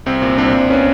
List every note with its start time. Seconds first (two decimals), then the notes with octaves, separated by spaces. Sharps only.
0.06 C2 C4
0.22 A#2
0.38 C2 C4 D4
0.54 C2
0.70 B3 C#4